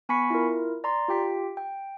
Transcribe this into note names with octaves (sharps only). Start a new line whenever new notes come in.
B3 G#5 B5 C#6 B6 C#7
E4 F4 A#4
D5 A#5 C6
F4 G4 G5 B6
G5